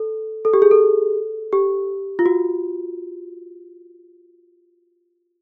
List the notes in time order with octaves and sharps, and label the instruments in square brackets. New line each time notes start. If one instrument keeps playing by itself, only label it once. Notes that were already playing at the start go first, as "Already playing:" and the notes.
Already playing: [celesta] A4
A4
G4
G#4
A4
G4
F4
F#4